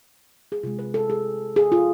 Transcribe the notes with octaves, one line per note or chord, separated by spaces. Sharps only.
G#4
C3 G#3 F4
B4
A4
G#4
G#4
F4